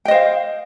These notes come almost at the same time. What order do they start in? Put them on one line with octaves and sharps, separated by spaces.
G5 D#5 C5 F5